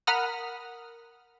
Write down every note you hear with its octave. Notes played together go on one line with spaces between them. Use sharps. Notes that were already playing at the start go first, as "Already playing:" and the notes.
A#4 F#5 B5 D#6 F6